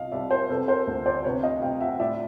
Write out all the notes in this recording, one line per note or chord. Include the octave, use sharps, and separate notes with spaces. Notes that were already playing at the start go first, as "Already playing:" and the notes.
Already playing: C2 D#5 F5
C2 D5 E5
A#4 C5
C3 A4 B4
A#4 C5
D2
C5 D5
C3 B4 C#5
D#5 F5
C3 F5 G5
E5 F#5
A2 D5 E5